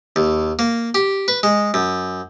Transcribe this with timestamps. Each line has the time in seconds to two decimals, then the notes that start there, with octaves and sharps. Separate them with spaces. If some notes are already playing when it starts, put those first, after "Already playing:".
0.16 D#2
0.59 A#3
0.95 G4
1.28 B4
1.43 G#3
1.74 F#2